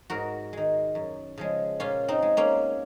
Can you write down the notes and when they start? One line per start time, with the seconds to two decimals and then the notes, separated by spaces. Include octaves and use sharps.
0.10 G#2 F#4 A#4
0.53 D#3 G#3
0.95 F#2
1.38 C#3 F3 G#3
1.80 A#2 C#4 F4
2.08 C4 D#4
2.22 G#3
2.37 A#3 C#4